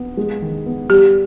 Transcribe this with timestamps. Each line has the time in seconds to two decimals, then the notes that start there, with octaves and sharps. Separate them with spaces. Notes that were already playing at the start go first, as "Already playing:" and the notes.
Already playing: B3
0.17 G#3
0.42 D#3
0.66 B3
0.90 G3 G4